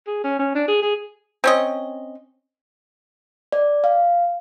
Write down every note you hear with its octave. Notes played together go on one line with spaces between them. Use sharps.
G#4
C#4
C#4
D4
G#4
G#4
C4 C#4 D#5
D5
F5